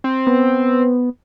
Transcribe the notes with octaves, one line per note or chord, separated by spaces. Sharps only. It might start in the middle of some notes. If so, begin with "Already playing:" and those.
C4
B3